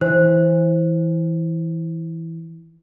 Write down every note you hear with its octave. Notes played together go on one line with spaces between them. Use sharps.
E3 C5